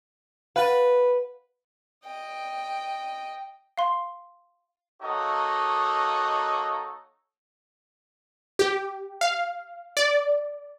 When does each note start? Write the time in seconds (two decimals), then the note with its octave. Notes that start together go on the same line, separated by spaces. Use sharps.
0.56 B4 F5 F#5 A6
2.05 D#5 G5
3.78 F5 C6
5.02 A#3 D#4 F#4 A4 C#5 D#5
8.59 G4
9.21 F5
9.97 D5